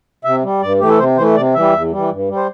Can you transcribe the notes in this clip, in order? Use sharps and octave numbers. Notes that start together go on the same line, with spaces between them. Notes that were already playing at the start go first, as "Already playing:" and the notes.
C3 E5
G3
G2 D5
E3 A3 G4
A4
C3 C5
E3 A3 C5
C3 D5
E3 G3 E5
E2
E3 G3
G2
G3
C5